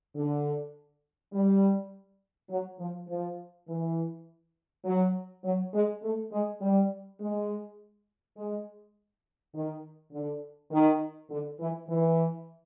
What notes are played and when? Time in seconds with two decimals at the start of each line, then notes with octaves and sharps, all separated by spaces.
0.16 D3
1.33 G3
2.51 F#3
2.79 F3
3.09 F3
3.68 E3
4.85 F#3
5.44 F#3
5.74 G#3
6.03 A3
6.32 G#3
6.61 G3
7.20 G#3
8.37 G#3
9.54 D#3
10.13 D3
10.72 D#3
11.30 D3
11.60 E3
11.89 E3